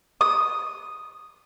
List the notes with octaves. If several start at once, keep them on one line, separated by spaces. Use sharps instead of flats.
D#6